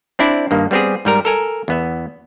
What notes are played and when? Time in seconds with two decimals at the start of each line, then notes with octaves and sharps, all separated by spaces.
0.19 C4 D4 E4 D5
0.51 G2 D#3 A#3
0.71 G3 B3 C4 G4 G#4
1.05 G#2 G3 A#4
1.25 A4 A#4 G#5
1.68 E2 B3 E5